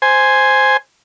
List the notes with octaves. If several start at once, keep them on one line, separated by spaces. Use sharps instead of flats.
C5 G#5